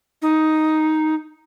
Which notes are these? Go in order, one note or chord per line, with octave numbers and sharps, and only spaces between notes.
D#4